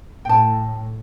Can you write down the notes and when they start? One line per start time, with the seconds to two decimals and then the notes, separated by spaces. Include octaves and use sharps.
0.25 A2 G5 A5